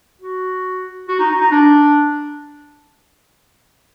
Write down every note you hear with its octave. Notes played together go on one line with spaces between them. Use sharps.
F#4
F#4
D#4
D#4
D#4
D4